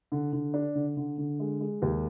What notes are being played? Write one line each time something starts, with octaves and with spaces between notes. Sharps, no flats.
D3
D3
D4
D3
D3
D3
G#3
G#3
D#2